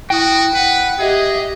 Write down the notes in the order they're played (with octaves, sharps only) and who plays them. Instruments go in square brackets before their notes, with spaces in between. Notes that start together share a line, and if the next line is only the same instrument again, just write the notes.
[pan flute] E4 [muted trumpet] F#4 [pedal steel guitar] G5 D#6
[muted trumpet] B4 [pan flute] F#5
[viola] G4 D#5 [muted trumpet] G#4 [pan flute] E5